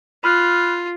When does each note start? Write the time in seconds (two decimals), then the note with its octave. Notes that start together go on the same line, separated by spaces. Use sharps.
0.24 F4 B5 F6 F#6